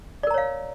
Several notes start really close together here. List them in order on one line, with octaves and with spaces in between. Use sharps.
D5 A#4 A#5 C#5 F5